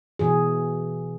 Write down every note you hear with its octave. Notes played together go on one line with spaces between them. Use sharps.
B2 E3 G#4